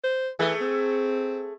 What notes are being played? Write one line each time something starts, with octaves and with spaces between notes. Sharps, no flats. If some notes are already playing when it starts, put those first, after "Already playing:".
C5
E3 A3 G#4
C4